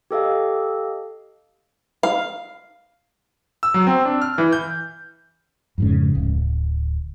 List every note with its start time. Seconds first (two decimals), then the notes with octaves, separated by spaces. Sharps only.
0.11 G4 A4 D#5 F5
2.03 F5
3.63 E6
3.74 F#3
3.87 C4
4.05 D4
4.22 F6
4.38 E3
4.53 G6
5.78 F2 G#2 C#3
6.15 D1